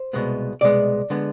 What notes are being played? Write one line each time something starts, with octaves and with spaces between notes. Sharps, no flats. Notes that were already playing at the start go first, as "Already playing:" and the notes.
Already playing: C5
C2 B2 G#3 B3
C2 B2 G#3 B3 D5
D3 G#3 B3